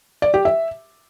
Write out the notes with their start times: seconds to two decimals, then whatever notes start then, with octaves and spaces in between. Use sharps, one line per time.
0.22 D5
0.34 G4
0.45 E5